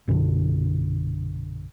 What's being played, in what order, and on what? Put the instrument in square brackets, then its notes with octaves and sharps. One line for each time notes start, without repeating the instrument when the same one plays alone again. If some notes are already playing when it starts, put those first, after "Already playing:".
[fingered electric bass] A#1 F#2 B2 D3